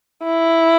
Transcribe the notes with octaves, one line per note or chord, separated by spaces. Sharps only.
E4